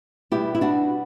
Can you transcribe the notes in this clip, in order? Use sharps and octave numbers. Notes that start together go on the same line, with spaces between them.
B2 G3 B3 E4 G4
E4
D4 F#4